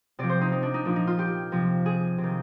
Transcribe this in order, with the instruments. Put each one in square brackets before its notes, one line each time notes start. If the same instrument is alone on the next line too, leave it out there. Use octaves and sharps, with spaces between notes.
[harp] C3 F3 D5
C5
D#4
D#4
D4
D#4
A#2 F3 D4
D#4
F4
G4
C3 F3
G#4
C3
D#3